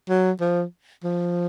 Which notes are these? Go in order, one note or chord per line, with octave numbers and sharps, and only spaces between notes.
F#3
F3
F3